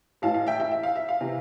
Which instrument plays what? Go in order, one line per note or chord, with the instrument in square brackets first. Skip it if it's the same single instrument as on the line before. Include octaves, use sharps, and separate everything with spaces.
[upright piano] A1 A2 E3 F5 A5
F5
E5 G5
E5 G5
E5
F5
E5
F5
C3 E3